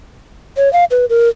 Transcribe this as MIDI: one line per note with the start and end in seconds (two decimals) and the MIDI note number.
0.57 0.71 73
0.73 0.84 77
0.91 1.05 71
1.10 1.28 70